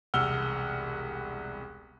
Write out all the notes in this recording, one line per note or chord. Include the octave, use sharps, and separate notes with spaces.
E1 C2 F#5 E6 F6 G7